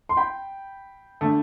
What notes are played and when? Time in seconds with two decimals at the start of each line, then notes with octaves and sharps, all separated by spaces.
0.09 C6
0.17 G5 B5
1.21 D3 A3